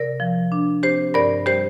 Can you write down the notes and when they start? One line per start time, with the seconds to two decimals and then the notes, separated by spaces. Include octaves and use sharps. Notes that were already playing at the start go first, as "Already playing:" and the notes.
Already playing: C3 A#4 D5
0.20 F3
0.52 D4
0.83 C4 G4 C5
1.14 G2 A#4 D5
1.46 G3 G4 C5